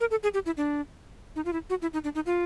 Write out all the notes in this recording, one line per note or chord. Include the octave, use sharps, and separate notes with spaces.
A#4
A4
G#4
G4
E4
D4
D#4
F4
E4
F#4
E4
D#4
D4
D#4
F4